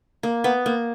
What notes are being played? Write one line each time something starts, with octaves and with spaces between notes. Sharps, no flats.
A#3
B3
A#3